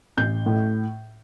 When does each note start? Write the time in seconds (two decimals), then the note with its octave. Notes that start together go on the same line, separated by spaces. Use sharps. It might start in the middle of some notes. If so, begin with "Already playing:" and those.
0.17 A1 G6
0.46 A2